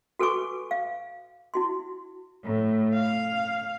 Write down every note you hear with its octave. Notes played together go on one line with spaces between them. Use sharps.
F#4 A4 B4 G#5 C#6 D6
F5
E4 F#4 C6
A2
F5